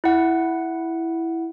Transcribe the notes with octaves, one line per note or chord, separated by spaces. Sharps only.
E4 F#5